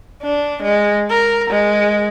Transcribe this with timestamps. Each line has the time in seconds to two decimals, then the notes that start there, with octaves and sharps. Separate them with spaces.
0.23 D4
0.63 G#3
1.10 A#4
1.50 G#3